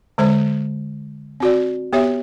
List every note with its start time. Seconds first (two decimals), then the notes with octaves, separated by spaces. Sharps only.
0.18 D3 G#3 C5
1.40 C4 F#4 D5
1.93 B3 G4 C#5 E5